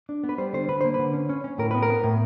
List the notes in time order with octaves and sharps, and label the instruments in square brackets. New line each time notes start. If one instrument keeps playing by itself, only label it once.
[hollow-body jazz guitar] D4
B3
B4
G3 C5
D3 C5
D3 B4
A#3 C5
D3 B4
C#4
C#4
C#4
A2 A#4
B3 B4
A#4
B3
A2